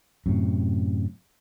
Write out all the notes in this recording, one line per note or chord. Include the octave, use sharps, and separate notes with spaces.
F#2 A2 C3